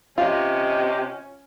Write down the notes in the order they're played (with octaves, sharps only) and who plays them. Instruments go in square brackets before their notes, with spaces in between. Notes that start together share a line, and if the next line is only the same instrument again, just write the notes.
[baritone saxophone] C3 [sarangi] C#4 [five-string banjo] F4 [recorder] D#5